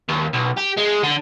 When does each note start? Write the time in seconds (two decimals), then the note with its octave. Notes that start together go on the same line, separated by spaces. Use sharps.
0.09 D#2
0.33 B1
0.57 G4
0.77 G#3
1.03 D3